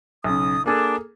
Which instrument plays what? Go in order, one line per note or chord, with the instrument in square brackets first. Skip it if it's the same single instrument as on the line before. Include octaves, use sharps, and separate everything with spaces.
[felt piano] B1 C#3 [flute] D#6
[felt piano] A#3 G#4 A4 [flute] D4